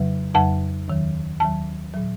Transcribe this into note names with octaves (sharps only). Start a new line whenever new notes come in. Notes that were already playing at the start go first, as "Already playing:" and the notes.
Already playing: F2 C#3 F#3
F2 C#3 F#3 A5
D#2 D#3 F#3
D#2 D#3 F#3 A5
A#2 F#3